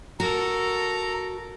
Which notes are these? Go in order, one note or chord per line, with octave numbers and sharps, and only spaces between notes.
F#4 A4 A#4 A#5